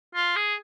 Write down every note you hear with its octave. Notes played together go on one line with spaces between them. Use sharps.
F4
G#4